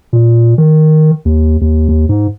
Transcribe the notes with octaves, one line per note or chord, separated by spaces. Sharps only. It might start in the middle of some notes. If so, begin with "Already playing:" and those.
A#2
D#3
D#2
D#2
D#2
G#2